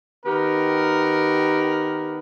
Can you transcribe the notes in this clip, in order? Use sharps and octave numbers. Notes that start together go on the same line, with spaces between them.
D#3 B3 G4 A#4